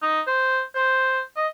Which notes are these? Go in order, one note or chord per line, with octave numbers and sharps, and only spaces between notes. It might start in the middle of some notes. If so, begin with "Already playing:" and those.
D#4
C5
C5
D#5